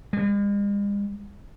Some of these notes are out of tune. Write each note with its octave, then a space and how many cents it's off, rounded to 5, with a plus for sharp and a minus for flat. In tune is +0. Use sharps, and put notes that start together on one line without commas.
G#3 -45